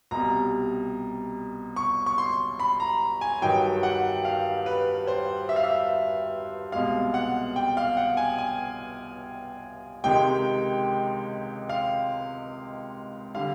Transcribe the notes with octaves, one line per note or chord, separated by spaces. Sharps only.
C2 B2 G3 A#5
C#6
C#6
C6
B5
A#5
G#5
G2 D#3 F#3 G5
F#5
F5
B4
C5
E5
F5
E5
C2 B2 G#3 F5
F#5
G5
F5
F#5
G#5
G#5
C#2 C3 D#3 G#3 G5
F5
D3 G3 F5